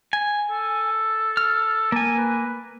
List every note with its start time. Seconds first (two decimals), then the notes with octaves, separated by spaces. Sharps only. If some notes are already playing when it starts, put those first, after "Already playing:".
0.13 G#5
0.50 A4
1.37 F6
1.92 A#3 G#5 A5
2.17 B4